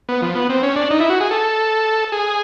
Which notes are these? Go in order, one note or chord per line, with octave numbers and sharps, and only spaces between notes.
B3
F3
B3
C4
C#4
D4
D#4
E4
F#4
G#4
A4
G#4